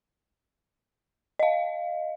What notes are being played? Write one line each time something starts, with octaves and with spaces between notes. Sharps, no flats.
D#5 F5